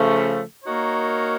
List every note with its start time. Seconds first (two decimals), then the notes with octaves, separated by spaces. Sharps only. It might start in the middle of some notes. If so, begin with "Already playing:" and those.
Already playing: C#3 F3 A3
0.64 A#3 D#4 F#4 A#4 C#5